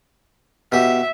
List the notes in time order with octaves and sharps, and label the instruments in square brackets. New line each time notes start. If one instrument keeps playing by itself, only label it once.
[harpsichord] B2 G4 [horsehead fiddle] E5